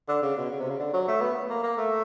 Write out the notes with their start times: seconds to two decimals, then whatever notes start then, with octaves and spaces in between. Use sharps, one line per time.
0.08 D3
0.22 C#3
0.37 B2
0.50 C#3
0.60 C3
0.70 C#3
0.79 D3
0.93 F#3
1.08 A3
1.21 B3
1.50 A#3
1.63 A#3
1.77 A3